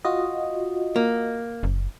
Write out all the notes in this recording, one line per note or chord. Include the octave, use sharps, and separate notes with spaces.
F4 F#4 D#5
A#3
F#1